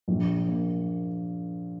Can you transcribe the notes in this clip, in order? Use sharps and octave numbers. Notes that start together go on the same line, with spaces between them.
A#1
A#3